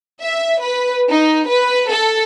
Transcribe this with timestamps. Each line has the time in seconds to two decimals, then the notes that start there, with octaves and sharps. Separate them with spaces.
0.23 E5
0.62 B4
1.10 D#4
1.47 B4
1.90 A4